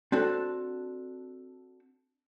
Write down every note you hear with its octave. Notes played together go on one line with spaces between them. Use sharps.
C4 D4 F#4 A4